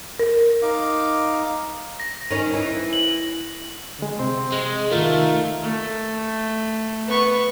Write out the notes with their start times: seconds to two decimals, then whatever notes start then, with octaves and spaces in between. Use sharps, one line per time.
0.19 A#4
0.62 D#4 F5 D6
2.00 A#6
2.31 D#3 C#4
2.54 E3
2.93 F#7
3.99 D3 G#3
4.19 C3 C4 C6
4.52 G#3
4.92 D#3 A3 F4 A#4
5.62 A3
7.07 B3 C#6